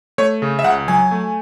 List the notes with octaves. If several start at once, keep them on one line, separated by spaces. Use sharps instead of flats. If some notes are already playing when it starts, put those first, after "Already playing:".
A3 C#5
C#3
E5
C#2 F#5
F#3 G#5
A3